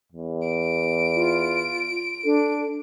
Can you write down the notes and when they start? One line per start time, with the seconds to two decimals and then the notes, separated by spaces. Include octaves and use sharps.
0.12 E2
0.48 D7
1.15 F4
2.25 D4 A4